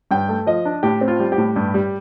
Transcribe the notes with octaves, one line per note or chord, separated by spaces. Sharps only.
G2 G5
A3
F3 D#5
D4
A2 G4
C4
F4
G3
G4
A2
G2
G3